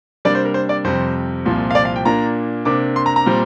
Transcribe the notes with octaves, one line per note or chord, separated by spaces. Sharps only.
C3 G3 A#3 D4 D5
C5
A#4
C5
D5
F2 C3 G3 C5
C2 A#2 F3 C4
F5
D5
F5
G5
A#2 A#3 D4 A#5
C3 A#3 D4 D6
C6
A#5
A#5
A#2 G3 C4